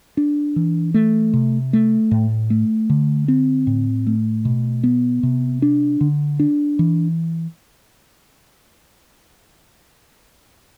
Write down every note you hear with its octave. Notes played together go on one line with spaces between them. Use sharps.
D4
E3
A3
C3
A3
A2
A3
D3
C4
A2
A3
B2
B3
C3
D4
D3
D4
E3